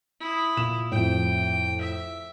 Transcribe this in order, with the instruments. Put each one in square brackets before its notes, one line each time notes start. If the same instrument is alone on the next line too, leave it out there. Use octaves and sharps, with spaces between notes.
[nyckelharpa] E4 D#6
[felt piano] A#2 E7
[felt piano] F2 A2 [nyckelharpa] G5
[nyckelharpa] E5